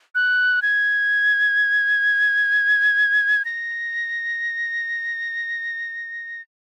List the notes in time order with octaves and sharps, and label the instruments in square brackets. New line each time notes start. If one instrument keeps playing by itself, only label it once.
[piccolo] F#6
G#6
A#6